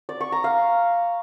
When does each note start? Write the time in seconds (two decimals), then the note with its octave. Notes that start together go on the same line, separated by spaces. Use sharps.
0.09 D5
0.21 C#6
0.32 A#5
0.44 F5